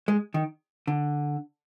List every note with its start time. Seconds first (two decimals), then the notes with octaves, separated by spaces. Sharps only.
0.08 G#3
0.34 D#3
0.87 D3